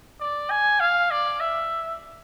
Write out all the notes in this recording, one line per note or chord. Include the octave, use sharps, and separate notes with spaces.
D5
G#5
F5
D5
E5